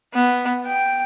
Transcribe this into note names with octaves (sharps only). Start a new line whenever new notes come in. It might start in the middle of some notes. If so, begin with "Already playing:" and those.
B3
G5